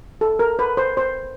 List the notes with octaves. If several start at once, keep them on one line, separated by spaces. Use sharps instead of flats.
A4
A#4
B4
C5
C5